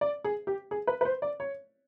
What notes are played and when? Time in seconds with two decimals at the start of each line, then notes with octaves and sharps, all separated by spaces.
0.01 D5
0.24 G#4
0.47 G4
0.71 G#4
0.87 B4
1.01 B4
1.05 C5
1.22 D5
1.40 C#5